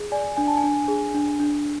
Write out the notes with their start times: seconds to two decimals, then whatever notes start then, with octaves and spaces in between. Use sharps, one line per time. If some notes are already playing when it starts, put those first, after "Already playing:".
Already playing: G#4
0.12 D5 G#5
0.37 D4 G#5
0.48 A5
0.57 G#5
0.63 D4
0.88 G#4
1.14 D4
1.40 D4